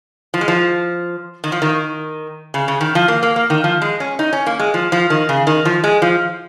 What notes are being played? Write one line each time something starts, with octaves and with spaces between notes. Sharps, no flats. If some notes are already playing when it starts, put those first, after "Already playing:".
F3
G#3
F3
D#3
F3
D#3
C#3
C#3
D#3
F3
A#3
A#3
A#3
D#3
F3
G#3
C#4
D#4
C#4
A#3
G#3
F3
F3
D#3
C#3
D#3
F3
G#3
F3